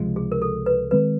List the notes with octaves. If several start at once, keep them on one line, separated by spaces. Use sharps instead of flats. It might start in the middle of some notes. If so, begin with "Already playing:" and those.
Already playing: C#2 C3 F3 G#3
G#4
A#4
A4
B4
D#3 G#3 C4 B4